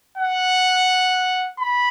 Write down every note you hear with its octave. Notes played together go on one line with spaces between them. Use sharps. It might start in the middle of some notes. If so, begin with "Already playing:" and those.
F#5
B5